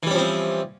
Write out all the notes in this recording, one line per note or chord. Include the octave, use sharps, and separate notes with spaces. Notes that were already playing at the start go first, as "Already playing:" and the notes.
E3 F3 G3 C4 C#4